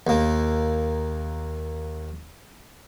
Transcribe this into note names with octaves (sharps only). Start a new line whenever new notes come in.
D#2 A#3